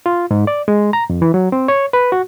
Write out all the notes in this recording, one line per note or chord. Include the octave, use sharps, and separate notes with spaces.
F4
G#2
D5
G#3
A#5
F2
E3
F#3
C4
C#5
B4
F#4